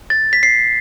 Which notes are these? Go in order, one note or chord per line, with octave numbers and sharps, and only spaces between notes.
A6
B6
C7